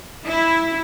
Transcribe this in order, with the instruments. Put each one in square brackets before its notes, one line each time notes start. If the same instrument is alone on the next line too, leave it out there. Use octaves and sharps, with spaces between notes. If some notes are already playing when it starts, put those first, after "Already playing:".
[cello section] E4